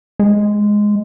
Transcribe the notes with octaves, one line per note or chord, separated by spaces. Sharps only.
G#3